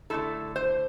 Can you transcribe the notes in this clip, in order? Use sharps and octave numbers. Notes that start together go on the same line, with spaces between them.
D3 A3 E4 A4
C5